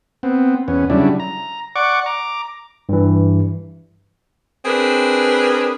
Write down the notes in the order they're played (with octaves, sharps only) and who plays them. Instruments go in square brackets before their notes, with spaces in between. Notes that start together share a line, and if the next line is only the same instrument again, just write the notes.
[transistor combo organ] B3 C4
E2 B3 C#4
C#3 F#3 G3 D4 E4
A#5
D5 F#5 C#6 D6
A#5 D6
[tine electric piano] G2 E3
[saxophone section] C4 D4 G#4 A#4 B4